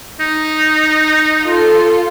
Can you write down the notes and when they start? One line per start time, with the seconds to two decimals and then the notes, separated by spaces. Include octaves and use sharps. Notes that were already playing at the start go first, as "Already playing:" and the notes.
0.20 D#4
1.44 F4 A4